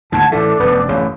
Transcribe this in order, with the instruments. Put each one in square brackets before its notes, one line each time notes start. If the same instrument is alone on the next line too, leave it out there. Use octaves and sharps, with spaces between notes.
[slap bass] D2 G#2 D#3 [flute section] F#5 A5 G#6
[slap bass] A2 E3 [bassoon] A3 [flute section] D4
[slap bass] F1 F#2 [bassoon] B3
[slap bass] A1 F#2 [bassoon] C#3